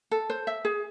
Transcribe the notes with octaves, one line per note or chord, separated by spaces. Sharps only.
A4
C5
E5
G#4